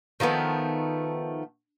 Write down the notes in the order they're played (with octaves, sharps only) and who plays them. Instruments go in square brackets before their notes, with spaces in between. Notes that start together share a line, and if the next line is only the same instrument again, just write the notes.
[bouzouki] D#3 F3 A3 B3